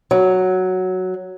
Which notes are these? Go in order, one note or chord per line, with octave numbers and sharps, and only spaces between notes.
F#3